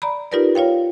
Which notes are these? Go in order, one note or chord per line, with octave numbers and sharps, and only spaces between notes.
D5 A#5 B5
D#4 F4 G4 A#4 B4 D5
F4 C#5 F5 G5